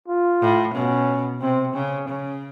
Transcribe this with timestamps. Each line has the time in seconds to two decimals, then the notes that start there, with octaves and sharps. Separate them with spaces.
0.08 F4
0.42 A2
0.74 B2 C#4
1.42 C3 C4
1.74 C#3 C#4
2.08 C#3 C#4